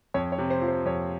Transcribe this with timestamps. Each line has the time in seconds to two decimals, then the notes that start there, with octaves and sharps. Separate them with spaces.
0.14 F2 C#5
0.32 C#5
0.38 C3
0.50 C5
0.62 F3
0.68 C5
0.86 F2 C#5